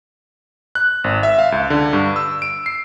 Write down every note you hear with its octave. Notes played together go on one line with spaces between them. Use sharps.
F#6
G#1
E5
F5
C#2
D3
G2
E6
D7
C7